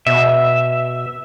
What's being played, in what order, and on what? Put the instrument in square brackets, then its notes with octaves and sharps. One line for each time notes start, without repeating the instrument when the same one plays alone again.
[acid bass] B2 [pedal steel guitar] E5